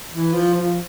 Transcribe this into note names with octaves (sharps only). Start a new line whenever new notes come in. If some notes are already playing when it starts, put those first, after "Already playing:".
E3
F3
F3